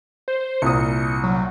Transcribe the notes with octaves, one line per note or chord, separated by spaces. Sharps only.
C5
C2 A#2 D#6 C#7
F#3